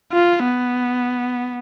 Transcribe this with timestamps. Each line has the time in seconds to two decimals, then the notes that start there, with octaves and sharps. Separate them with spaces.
0.12 F4
0.44 B3